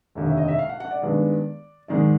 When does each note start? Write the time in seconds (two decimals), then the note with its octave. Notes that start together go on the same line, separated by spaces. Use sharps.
0.15 F1 D#2 D3
0.26 E5
0.37 D#5
0.48 E5
0.59 F5
0.69 F#5
0.80 F#5
0.91 D5
1.02 G2 D#3 G#3 B3
1.88 G#2 D#3 G#3 D5